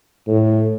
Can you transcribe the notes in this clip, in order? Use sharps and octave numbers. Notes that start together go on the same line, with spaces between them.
A2